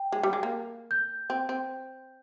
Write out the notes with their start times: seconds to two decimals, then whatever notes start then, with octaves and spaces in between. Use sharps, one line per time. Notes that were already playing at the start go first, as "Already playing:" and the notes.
Already playing: G5
0.12 G#3
0.23 G3
0.33 G#3
0.43 A#3
0.91 G6
1.30 C4
1.49 C4